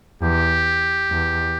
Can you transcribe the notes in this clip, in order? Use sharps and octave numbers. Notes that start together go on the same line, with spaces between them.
E2 G4
E2